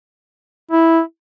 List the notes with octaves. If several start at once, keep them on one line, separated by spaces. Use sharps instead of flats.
E4